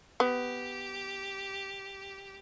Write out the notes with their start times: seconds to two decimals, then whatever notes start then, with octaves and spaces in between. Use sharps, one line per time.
0.20 B3 G4